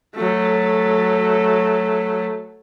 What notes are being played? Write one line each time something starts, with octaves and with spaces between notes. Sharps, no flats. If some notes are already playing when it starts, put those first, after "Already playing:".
F#3 A3